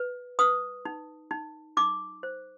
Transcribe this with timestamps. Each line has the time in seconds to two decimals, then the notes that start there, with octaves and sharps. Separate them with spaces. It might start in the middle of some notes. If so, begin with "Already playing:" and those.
Already playing: B4
0.39 B4 D#6
0.85 D#4
1.31 D#4
1.77 D#4 D6
2.23 C5